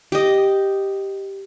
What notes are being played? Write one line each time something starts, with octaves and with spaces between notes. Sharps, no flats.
G4 D#5